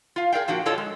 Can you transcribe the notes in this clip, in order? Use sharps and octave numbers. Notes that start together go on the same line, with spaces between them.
F4 F5
G#4 A#4 D5 F5 G5
A#2 F3 D4 F#4 G5
D4 F4 A4 C#5 D#5
G#3